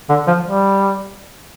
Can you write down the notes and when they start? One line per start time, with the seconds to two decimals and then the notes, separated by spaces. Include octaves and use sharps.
0.10 D3
0.27 F3
0.44 G3